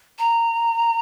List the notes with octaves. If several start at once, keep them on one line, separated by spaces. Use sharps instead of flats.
A#5